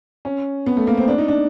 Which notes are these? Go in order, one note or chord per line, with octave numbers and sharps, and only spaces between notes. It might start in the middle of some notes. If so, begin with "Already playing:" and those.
C#4
B3
A3
A#3
C4
D4
D#4
D4